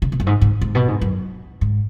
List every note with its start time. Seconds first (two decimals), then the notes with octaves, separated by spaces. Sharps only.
0.02 C#3
0.12 B2
0.20 F#2
0.27 G#2
0.41 G#2
0.61 G#2
0.75 B2
0.88 G#2
1.01 F#2
1.61 G#2